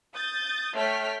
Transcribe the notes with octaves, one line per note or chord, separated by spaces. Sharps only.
D#6 G6 A6
A3 C#5 G5 F6 B6